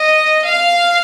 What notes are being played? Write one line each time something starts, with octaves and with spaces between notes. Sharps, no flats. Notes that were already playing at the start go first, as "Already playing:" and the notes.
Already playing: D#5
F5